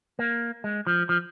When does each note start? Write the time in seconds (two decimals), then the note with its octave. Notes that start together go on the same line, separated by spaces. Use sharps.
0.19 A#3
0.64 G#3
0.87 F3
1.09 F3